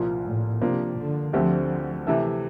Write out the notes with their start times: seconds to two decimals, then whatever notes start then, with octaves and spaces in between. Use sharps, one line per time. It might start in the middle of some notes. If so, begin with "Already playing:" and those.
Already playing: C2 A#2 F3 A#3 F4
0.24 A2
0.61 C3 F3 A#3 D4
0.97 D3
1.33 D2 D3 F3 A3 C4 G4
2.07 C3 E3 A3